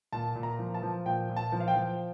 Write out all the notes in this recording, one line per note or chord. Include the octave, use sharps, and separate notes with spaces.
A#2 A5
A#2
A#5
F3
A5
F3
A#2 G5
A#2
A5
F3
F5
G5
F3